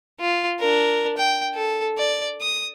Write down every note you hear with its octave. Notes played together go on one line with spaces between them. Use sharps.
F4
D4 A#4
G5
A4
D5
D#6